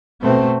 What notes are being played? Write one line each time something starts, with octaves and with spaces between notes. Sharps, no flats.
B2 A3 C4